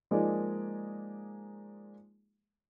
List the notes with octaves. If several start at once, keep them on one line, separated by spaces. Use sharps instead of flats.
F3 G#3 A#3 D#4 G#4 D5